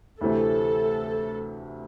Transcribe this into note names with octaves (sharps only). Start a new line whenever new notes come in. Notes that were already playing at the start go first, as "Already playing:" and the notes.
D2 C3 E3 A3 C4 A4